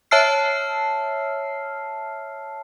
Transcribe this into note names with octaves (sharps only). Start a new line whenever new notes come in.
C#5 E5 A5 E6 F6 C7